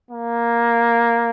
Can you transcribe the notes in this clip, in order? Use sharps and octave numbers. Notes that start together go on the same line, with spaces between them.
A#3